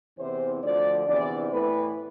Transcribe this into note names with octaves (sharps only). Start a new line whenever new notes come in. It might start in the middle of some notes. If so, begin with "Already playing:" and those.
E2 C3 E3 C5
D2 D3 F3 D5
E2 C3 E3 D5
A2 E3 B4